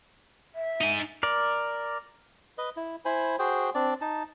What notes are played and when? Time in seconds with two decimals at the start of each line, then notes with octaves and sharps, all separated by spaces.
0.55 E5
0.81 D#4 G#5
1.23 A#4 D5
2.58 B4 D#5
2.76 E4
3.05 E4 C5 G#5 B5
3.39 F#4 G#4 C5 G5
3.75 C4 D4 D5
4.01 D#4 A5